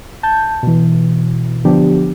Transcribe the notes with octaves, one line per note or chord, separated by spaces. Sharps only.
A5 G6
B2 E3
D3 F3 B3 D4 G4